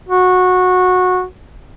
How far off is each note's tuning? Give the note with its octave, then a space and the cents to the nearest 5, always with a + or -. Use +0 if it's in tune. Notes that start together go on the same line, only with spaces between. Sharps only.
F#4 -15